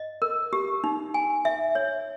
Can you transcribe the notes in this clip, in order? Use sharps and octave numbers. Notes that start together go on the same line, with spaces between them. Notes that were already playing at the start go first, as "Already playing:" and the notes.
Already playing: D#5
A#4
G4
D#4
G#5
E5
C#5